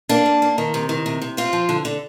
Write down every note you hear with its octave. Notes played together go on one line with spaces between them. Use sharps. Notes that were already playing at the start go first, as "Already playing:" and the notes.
A#3 D4
A#3
A#3
D#3
C3
D#3
C3
C3
C4 F4
F3
D3
D3